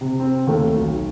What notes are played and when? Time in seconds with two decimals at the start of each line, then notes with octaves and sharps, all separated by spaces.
0.01 C3
0.20 C4
0.47 D#2 A3
0.76 B1